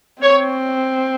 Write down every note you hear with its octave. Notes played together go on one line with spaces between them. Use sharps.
C4 C#5